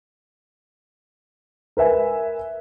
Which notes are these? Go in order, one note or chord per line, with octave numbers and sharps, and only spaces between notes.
A#4 B4 E5 G#5